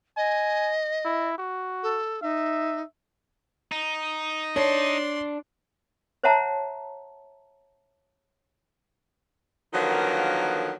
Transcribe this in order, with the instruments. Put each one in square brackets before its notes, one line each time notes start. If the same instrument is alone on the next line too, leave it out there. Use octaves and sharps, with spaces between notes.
[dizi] D#5 [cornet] G#5
[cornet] E4
F#4
[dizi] A4
[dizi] D#4 [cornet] E5
[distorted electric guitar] D#4
[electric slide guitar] D4 [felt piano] C#5 [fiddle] D5 C6
[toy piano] C5 C#5 E5 F#5 A5 A#5
[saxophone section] D3 D#3 F3 F#3 A#3 B3